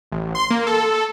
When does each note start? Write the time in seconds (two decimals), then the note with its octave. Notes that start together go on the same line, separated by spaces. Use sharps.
0.12 A1
0.35 C6
0.50 A#3
0.67 A4